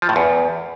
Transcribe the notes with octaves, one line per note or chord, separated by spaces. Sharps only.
F3
A2
E2